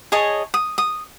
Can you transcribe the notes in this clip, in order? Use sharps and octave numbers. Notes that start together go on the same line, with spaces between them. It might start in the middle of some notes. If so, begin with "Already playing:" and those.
G#4 C#5 D#5 A5
D#6
D#6